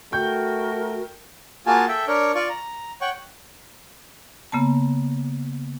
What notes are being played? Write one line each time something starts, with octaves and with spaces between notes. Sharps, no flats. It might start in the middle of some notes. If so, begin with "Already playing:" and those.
A3 F#4 A#4 G5 C#6 G6
A#3 F4 F#4 G#4 G#5 A5
A4 E5 G5
D4 A#4 C#5
F4 D5 C#6
A#5
C#5 F#5 G5 C#6
C#3 A#3 B3 A5